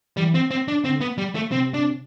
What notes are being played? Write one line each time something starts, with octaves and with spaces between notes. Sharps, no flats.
E3 G3
C4
C4
D4
D3 C4
B3
G3
A3
C3 C4
D4